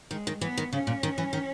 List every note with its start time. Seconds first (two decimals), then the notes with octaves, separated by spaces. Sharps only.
0.11 D#3 G#3
0.27 D#3
0.41 E3 B3
0.57 D#3
0.73 C#3 C#4
0.87 A#2
1.03 D#3
1.18 E3
1.33 D#3